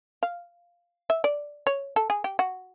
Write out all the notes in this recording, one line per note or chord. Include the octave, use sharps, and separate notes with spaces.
F5
E5
D5
C#5
A4
G#4
G4
F#4